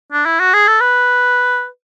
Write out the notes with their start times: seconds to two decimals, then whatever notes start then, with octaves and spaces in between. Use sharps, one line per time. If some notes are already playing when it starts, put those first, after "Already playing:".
0.12 D4
0.26 E4
0.40 F#4
0.54 G#4
0.68 A4
0.81 B4